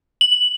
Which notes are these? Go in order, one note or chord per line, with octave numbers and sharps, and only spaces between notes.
F#7